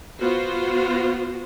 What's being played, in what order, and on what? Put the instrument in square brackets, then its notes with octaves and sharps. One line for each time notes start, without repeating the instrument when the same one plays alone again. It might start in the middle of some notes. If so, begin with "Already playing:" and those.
[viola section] B3 F4 F#4 C5